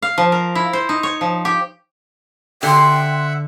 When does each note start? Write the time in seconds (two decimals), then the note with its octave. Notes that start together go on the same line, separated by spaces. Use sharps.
0.02 F5
0.18 F3
0.32 A#4
0.55 E4
0.73 C5
0.89 D#4
1.03 C#5
1.21 F3
1.45 G4
2.63 D3 E5 F#5 G5 C6